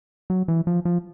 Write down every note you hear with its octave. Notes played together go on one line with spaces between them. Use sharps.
F#3
E3
F3
F3